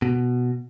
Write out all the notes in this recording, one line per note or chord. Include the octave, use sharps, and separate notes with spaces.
B2